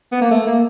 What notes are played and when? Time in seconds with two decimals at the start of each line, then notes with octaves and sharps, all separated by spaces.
0.12 B3
0.21 A#3
0.31 A3
0.47 A#3